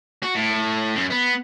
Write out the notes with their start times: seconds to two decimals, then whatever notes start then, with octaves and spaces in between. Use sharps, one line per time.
0.23 F#4
0.35 A2
0.96 F#2
1.11 B3